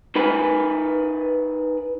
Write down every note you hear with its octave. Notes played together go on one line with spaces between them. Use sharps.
D#4 A#4 B4 G#5 B5